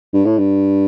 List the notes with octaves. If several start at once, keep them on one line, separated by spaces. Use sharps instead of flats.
G2
A2
G2